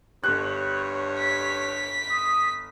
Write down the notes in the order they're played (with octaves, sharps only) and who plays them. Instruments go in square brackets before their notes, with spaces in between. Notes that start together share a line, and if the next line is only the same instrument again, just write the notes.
[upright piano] G1 F#6 [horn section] G2 C#5
[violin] B6
[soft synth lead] D#6